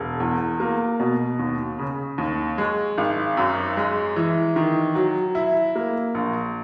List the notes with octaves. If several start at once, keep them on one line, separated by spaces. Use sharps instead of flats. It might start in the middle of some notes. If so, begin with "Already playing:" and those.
Already playing: E1
E2
A#3
B2
D#2
C#3
D#2
G#3
G#1
F#2
G#3
E3
D#3
F#3
E4
A#3
A#1